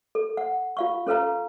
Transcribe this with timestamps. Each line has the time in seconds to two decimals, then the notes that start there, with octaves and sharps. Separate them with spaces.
0.15 A4
0.37 F#5
0.77 F4 F5 C#6
1.07 C#4 A4 B4 F5 A#5